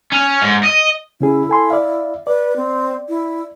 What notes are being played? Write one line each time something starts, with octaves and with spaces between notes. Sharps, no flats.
C#4
G#2
D#5
C#3 C#4 E4 G#4
A4 G#5 C6
D5 E5 F5
B4 D5
C4
E4